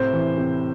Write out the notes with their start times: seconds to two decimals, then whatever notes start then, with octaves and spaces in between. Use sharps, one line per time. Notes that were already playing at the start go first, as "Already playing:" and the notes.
Already playing: A2 C3 C5
0.13 E3
0.38 C3